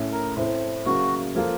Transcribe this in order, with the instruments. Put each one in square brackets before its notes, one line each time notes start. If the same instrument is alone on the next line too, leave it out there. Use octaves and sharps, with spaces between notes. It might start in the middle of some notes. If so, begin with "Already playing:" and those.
Already playing: [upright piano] A2 A3 C#4
[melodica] A#4
[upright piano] A2 A3 C4
[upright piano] C#3 F#3 A#3 [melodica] F#4
[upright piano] F3 A#3 F4 A4